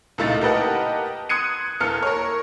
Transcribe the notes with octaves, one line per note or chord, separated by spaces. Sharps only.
C#2 A#2 A3 D#4 E4 A6
G4 A#4 B4 D#5 F#5 A5
C6 D#6 F#6 G#6 C#7 D#7
E2 A#3 A4 F6 C#7
A#4 C#5